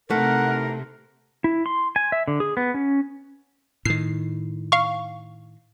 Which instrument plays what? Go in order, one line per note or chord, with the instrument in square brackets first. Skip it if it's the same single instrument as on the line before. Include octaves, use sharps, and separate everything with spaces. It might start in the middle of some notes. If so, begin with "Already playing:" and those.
[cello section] C3 [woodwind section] E3 D#4 A#4 [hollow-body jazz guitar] A3 [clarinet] F#5
[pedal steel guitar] E4
C6
G#5
E5
D3
G#4
B3
C#4
[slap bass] A2 D#3 [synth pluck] C7
[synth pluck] F5 C#6